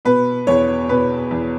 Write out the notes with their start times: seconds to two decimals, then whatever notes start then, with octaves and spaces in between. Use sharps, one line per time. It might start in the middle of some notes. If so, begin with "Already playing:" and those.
0.05 B2 B4
0.47 E2 C#5
0.89 B2 B4
1.31 E2